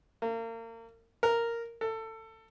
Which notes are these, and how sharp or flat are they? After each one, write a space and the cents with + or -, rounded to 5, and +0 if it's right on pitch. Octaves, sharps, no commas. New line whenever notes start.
A#3 -35
A#4 -5
A4 +20